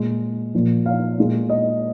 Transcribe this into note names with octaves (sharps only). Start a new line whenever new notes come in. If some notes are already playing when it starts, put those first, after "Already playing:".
Already playing: A#2 G#3
A#2 F3 A#3
F5
A#2 G#3
D#5